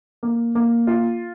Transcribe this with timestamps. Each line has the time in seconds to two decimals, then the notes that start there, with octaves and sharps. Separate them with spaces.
0.23 A#3
0.55 A#3
0.87 F4